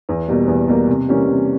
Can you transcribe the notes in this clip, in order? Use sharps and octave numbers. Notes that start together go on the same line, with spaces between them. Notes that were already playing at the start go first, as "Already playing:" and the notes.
E2
B2 G3 A#3
E2
B2 G3 A#3
C3
E3 G3 A#3 C#4
C3